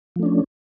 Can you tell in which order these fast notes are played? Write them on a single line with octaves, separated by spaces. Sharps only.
F3 A3 D4 C#4